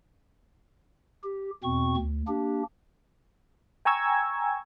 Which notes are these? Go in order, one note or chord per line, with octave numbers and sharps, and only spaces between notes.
G4
E2 B2 C4 C#6
D2
A#3 D4 G4
G5 G#5 A#5 C#6 E6 G#6